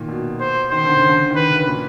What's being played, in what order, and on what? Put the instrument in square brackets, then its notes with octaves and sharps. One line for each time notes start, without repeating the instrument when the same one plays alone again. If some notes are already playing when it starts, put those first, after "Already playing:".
Already playing: [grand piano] A#2 D#3
B2
[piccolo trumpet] C5
[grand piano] D#3 [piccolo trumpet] C5
[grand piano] D3
C#3
D3
D#3
[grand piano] D3 [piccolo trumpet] B4
[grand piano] C#3
A#2